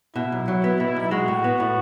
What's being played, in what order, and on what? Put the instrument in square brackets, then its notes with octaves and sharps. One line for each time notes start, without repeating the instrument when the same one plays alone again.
[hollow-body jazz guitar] B2 [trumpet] E4
[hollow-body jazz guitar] B1
F#3
B3
B2
B1
[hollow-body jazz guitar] G#3 [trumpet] F#4
[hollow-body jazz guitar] A2
B3
A2